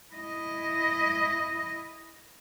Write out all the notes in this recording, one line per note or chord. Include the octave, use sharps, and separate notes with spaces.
E4 D#5